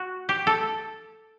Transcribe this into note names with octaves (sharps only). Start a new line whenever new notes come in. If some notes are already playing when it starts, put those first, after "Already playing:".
Already playing: F#4
G4
A4